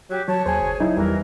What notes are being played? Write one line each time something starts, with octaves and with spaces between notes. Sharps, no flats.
F#3 G4
F#3 C#5 A5
D#2 G#4 C5 G#5
F#1
F#3 D#4 E4
E2 E3 G3 A#4